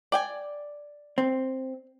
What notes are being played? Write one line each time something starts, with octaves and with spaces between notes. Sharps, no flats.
D5 G5 G#5
C4